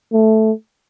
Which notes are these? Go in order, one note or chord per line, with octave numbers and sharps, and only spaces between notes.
A3